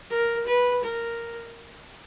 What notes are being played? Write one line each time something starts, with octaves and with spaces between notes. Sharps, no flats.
A#4
B4
A#4